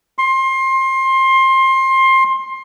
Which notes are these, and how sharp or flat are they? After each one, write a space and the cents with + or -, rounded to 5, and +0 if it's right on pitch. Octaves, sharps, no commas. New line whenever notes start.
C6 +25